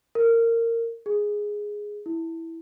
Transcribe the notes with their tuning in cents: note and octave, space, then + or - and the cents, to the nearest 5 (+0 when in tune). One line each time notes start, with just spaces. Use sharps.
A#4 -20
G#4 +0
E4 -5